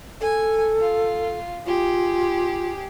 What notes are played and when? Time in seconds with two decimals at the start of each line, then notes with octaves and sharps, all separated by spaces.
0.21 A4 G#5
0.81 F4
1.66 F4 G4 G#4